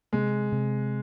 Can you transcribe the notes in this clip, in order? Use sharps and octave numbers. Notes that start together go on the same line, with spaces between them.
C3 G#3
C3